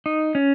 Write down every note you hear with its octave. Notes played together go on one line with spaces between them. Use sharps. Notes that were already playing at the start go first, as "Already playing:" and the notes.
D#4
C#4